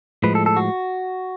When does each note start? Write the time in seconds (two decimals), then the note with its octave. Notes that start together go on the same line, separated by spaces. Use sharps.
0.23 A2 F3 G#3 B4
0.35 A4
0.46 A4
0.57 F#4